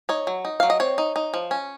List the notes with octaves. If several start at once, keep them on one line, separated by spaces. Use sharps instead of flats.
D#4 C#5
F#3
D#4
F#3 F5
D#5
C4 C#5
D#4
D#4
F3
C#4